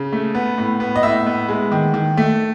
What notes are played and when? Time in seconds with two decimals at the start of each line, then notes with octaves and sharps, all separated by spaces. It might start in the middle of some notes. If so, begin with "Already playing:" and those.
Already playing: C#3
0.13 A3
0.35 B3
0.58 A2
0.80 B3
0.96 D#5
1.03 A2 E5
1.27 B3
1.49 G#3
1.72 D#3
1.94 D#3
2.17 A3